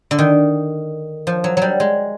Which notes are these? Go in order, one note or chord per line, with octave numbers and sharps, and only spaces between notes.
D3
D#3
F3
F#3
F#3 G3
G#3